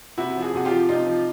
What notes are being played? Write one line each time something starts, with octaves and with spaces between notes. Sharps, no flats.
C3 E4 F#4
F3
F#4 G#4
C3 F#4
F4 G4
F3
C3 D#4 F4
F3